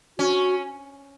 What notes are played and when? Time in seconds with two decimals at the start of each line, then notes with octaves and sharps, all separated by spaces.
0.18 C#4 F#4